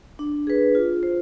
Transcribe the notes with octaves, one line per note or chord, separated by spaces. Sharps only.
D4
G#4 B4
F4
C5